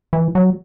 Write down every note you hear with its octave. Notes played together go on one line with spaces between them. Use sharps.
E3
F#3